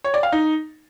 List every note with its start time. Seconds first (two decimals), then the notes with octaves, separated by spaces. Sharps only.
0.04 C#5
0.14 D5
0.23 F5
0.32 D#4